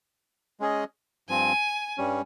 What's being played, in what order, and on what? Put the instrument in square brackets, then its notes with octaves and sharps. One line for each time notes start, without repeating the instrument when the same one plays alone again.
[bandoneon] G#3 C#4 G#4 D#5
[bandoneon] G2 F3 C4 [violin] G#5
[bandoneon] G2 G3 C#4